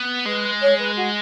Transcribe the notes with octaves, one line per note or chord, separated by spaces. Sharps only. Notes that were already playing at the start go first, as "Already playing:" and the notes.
Already playing: B3
G#3 B4
C#5
B4
F#4